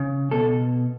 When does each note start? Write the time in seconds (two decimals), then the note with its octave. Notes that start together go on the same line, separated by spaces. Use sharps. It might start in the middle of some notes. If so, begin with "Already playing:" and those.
Already playing: C#3
0.31 B2 A4